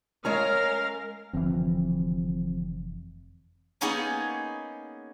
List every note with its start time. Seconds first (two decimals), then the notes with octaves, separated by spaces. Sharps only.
0.25 G#3 C#4 A#4 C#5 F5 G#5 A#5
1.34 F1 D3 E3 F3 C4
3.81 A#3 B3 C#4 D#4 G4 G#4